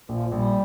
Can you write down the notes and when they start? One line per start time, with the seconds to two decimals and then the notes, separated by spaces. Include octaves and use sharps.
0.09 A#1 F3
0.32 A#1 G3